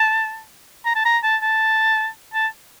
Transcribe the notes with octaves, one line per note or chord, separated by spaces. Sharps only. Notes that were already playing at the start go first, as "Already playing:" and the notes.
Already playing: A5
A#5
A5
A#5
A5
A5
A5